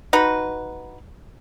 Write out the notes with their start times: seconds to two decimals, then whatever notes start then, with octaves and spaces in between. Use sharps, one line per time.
0.13 D#4 F#4 B4